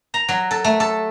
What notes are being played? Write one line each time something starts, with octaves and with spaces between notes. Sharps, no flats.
A#5
F#3
A4
A3
A4